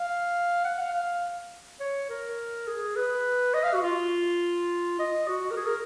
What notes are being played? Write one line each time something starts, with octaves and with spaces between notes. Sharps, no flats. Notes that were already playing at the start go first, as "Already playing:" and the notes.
Already playing: F5
F#5
F5
F5
C#5
A#4
G#4
B4
D#5
F5
F#4
F4
D#5
F#4
A#4
G#4
A#4